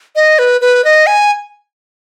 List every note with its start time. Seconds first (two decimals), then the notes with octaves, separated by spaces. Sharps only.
0.16 D#5
0.39 B4
0.61 B4
0.84 D#5
1.07 G#5